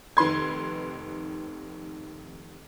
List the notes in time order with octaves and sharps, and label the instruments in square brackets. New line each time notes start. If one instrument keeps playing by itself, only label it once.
[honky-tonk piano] F1 D#3 B4 C6 G#6